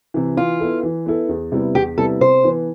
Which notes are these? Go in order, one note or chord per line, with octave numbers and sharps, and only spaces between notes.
C3 E3
E3 F4
B3 E4 A4
E3
B3 E4 A4
E2
C3 G3 B3 E4
E2 G4
C3 G3 B3 E4 A4
C3 C5
E3 B3